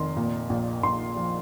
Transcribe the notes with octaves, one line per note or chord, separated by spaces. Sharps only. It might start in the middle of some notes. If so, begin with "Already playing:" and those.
Already playing: F1 D#3 C6
A#2
A#1
A#1 C6
F3